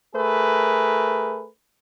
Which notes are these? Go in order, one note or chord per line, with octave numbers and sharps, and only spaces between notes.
A3 G#4 A#4 B4